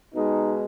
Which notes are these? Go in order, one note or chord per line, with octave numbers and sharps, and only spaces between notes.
B2 G#3 D#4